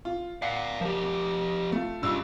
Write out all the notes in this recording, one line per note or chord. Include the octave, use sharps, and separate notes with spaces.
F4
D5 F5 F#5 C7
F3 G4 A#4
A3 F4
G2 C#4 F4 E6